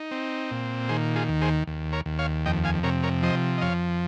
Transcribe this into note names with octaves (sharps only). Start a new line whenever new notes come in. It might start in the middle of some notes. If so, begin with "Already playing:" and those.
Already playing: D#4
C4
A#2
D#3 G#4 C5
F4 G#4
D#2
G#4 C5
D#2
A#4 C#5
D#2
C#5 F5
F2 D#5 G5
F5 G#5
C3 A#4 C#5
A#4 C#5
F3 C5 D#5
D#5
F2 C#5 F5